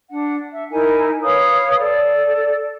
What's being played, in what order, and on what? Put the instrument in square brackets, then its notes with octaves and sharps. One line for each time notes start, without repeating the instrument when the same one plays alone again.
[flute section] D4 F#5
E5
D#4 E4 A#4 G#5
B4 C#5 F5 D#6
A4 D5